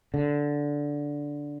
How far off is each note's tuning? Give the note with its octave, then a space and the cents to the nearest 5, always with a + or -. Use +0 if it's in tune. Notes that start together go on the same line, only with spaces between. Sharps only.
D3 -10